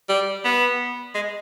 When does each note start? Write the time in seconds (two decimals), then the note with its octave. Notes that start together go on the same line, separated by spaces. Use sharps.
0.09 G3
0.45 B3
1.15 G#3